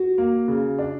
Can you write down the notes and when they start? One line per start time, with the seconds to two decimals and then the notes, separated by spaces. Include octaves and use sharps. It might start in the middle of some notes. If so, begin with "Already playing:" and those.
Already playing: F#4
0.18 A#3
0.48 C#3
0.79 D4